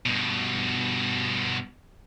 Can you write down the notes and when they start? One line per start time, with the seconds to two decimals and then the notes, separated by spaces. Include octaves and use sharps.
0.06 G2 B2